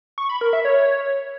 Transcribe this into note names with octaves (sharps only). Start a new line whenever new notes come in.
C#6
B5
A#4
E5
C#5